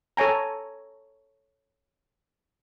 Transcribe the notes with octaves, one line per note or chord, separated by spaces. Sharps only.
A4 C#5 G#5 A#5